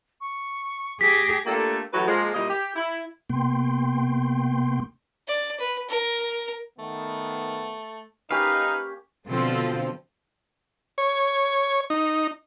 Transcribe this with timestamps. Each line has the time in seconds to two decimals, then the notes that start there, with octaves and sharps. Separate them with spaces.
0.21 C#6
1.01 G4 G#4 A#6 B6
1.46 A3 A#3 D4 F4 G4 A4
1.93 E3 F#3 A3 F#4 G4 B4
2.08 F3 G#3 A#3
2.34 A#2 G3 E4 D#5
2.49 G4
2.75 E4
3.30 C3 A#3 B3 G5 C6
5.28 D5
5.60 B4
5.89 A#4
6.79 D#3 A3 B3
8.31 A#3 C#4 D#4 G4 B4 F5
9.28 B2 D3 F3 C4 F4 A4
10.98 C#5
11.90 D#4